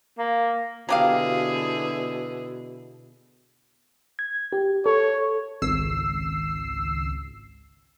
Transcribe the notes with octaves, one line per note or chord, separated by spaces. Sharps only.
A#3
B2 D3 F#3 E4 G4 G#4 F5
G#6
G4
A4 C#5
G#1 C#2 E6 C7